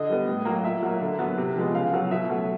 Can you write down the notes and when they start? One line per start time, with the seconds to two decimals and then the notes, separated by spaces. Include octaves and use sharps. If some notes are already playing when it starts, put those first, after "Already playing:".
Already playing: D3 D#5
0.09 G3 B3
0.27 A2
0.45 F#3 A#3
0.64 A#2 E5
0.83 F#3 A#3
1.01 D3
1.19 F#3 B3
1.38 C3
1.56 F3 G#3 B3
1.74 C#3 F5
1.93 F#3 B3
2.11 B2 E5
2.29 F#3 A3